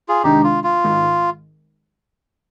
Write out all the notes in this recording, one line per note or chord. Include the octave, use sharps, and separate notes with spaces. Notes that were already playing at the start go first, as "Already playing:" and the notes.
F4 G#4
C2 C3 D#3 G#3 D4 D#4 G4
F4
F4
G#1 G#2 D#3 G#3